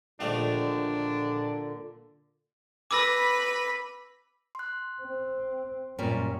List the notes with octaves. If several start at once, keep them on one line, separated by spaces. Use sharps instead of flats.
A#1 A#2 D3 D#3 A3 D4
B4 B5 D6 E6 A#6
C6 F#6
C4
F#2 A#2 G3 C#4